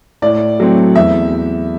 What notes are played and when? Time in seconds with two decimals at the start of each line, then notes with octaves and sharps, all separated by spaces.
0.22 A2 D5
0.60 F#3 A3 C4
0.95 E2 E5